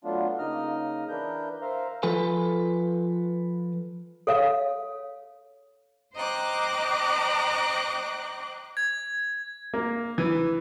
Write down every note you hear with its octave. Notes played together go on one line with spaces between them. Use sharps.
F#3 A3 B3 D4 F4
C#3 A#3 D#4 D#5 F6
E3 D4 A#4 B4 G6
A#4 C5 E5 F5 A#5
F3 F4 A4 B4 G#5
A4 C#5 F5
C5 D#5 G5 A#5 D6 F#6
G#6
A#3
E3